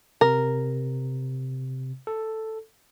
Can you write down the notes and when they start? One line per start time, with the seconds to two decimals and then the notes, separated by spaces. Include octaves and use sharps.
0.21 C3 A#4
2.07 A4